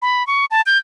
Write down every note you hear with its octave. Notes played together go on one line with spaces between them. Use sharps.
B5
C#6
A5
G6